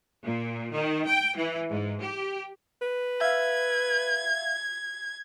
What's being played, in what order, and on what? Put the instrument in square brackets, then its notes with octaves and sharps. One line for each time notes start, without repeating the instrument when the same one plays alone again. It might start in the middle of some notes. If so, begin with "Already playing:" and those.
[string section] A#2
D#3
G5
E3
G#2
G4
[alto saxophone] B4
[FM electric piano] E5 F5 [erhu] G#6